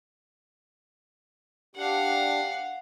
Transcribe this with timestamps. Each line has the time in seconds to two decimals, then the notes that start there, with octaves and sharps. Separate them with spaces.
1.75 D4 G4 F5 F#5